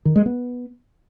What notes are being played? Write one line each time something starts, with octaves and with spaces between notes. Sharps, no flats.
D#3
G#3
B3